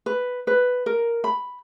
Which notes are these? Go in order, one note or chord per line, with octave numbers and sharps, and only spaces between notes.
B4
B4
A#4
B5